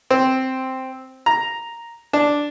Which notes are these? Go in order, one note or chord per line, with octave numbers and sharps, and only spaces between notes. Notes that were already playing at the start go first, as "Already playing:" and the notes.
C4
A#5
D4